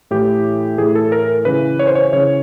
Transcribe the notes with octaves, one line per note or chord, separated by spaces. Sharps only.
A2 E3 G4
A2 E3 G#4
A4
A#4
C#3 E3 B4
C#5
C5
C#5
C#3 E3 C#5